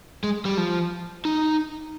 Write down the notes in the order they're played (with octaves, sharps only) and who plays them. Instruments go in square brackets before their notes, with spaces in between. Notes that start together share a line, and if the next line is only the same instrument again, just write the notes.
[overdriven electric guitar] G#3
G3
F3
D#4